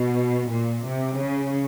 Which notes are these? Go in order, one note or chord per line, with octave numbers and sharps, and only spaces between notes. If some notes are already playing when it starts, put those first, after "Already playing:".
Already playing: B2
A#2
C3
C#3